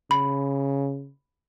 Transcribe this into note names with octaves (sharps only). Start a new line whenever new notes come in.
C#3 B5